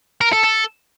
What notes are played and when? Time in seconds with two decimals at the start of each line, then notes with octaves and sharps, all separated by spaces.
0.21 A#4
0.33 A4
0.44 A4